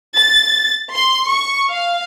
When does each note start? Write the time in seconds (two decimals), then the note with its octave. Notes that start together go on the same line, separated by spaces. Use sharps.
0.16 A6
0.94 C6
1.30 C#6
1.71 F5